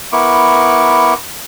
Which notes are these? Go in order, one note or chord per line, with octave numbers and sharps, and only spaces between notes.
B3 E4 A#4 C#6 D6